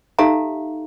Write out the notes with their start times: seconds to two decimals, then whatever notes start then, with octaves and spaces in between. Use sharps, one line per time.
0.19 D#4 G4 A4 E5 F5 A#5